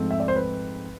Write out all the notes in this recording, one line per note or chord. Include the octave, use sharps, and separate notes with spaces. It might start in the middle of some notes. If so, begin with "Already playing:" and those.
Already playing: G#2 F3 A3 C4
E5
D5
C5
B4